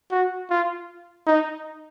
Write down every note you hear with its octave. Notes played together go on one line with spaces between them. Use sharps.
F#4
F4
D#4